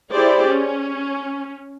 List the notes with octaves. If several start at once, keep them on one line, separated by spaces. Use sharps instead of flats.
E4 G4 G#4 C5 D5
C#4